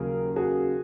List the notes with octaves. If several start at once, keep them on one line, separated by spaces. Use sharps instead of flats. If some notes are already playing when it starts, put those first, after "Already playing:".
Already playing: D#2 C#3 F#3 G#4 A#4
F#4 G#4